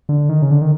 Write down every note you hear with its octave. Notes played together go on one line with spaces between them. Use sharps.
D3
D#3
C#3
D3
D#3